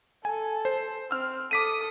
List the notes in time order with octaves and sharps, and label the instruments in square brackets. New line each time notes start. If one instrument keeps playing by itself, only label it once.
[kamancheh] A4 [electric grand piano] G#5
[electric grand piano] C5
[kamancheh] C4 [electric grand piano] E6 F6
[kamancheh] A4 D#6 [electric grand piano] D6 B6 D#7